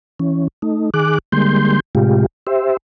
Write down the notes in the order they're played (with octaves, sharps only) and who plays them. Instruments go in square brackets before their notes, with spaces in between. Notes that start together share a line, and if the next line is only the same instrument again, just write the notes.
[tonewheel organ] E3 C#4
A3 D#4
D#3 G#4 D6 F#6
D3 G3 G#3 A#3 C6 G6
A2 C3 G#3 F4 G4
G4 C5 E5